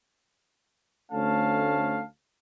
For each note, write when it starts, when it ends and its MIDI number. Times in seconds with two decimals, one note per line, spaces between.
1.12 2.01 38
1.12 2.01 57
1.12 2.01 61
1.12 2.01 77
1.12 2.01 81